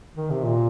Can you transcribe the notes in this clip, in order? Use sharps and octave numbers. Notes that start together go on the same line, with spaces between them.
D#3
C3
A#2